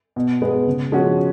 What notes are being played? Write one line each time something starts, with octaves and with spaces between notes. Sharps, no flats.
B2
G#3 B3
C#3
F3 G#3 C#4 F#4